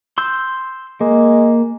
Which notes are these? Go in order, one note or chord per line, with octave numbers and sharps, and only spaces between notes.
C6 E6 G6
G#3 A#3